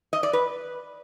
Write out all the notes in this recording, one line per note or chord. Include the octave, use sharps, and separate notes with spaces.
D#5
D5
B4